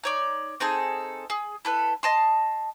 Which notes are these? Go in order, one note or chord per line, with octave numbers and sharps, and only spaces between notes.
D#4 C#5 D5
C4 D#4 G#4 A4
G#4
E4 A4 B4
D#5 A5 C6